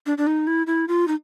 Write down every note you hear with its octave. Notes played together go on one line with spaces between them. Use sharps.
D4
D4
D#4
E4
E4
F4
D#4